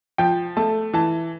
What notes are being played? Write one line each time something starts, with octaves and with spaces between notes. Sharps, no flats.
F3 G5
A3 A5
E3 A5